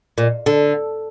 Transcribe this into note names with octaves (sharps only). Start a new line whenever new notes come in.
A#2
D3